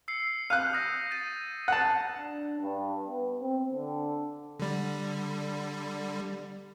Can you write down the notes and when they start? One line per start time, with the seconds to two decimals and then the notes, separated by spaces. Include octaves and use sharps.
0.08 E6 C7 C#7
0.50 F5 F#6 G6 D#7
0.73 D#6 E6 A#6
1.10 G6 A6 D#7
1.68 F#5 A5
2.19 D4
2.61 G2
3.08 B3
3.41 C4
3.73 D3
4.60 D3 G3